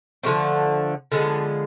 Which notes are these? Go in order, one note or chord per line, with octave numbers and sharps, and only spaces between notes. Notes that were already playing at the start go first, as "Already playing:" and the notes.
D3 F3 A3 C4
D3 F3 G#3 B3